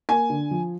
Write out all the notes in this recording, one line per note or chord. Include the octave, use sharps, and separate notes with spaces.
A#3 G#5
D3
F3